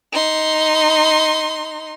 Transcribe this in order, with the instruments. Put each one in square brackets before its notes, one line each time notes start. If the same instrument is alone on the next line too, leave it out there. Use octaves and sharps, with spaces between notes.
[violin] D#4 C6